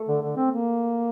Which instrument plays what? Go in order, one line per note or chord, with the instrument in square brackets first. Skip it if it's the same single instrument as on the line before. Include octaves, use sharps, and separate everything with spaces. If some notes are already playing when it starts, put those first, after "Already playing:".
Already playing: [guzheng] A3
[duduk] D3
D3
C4
A#3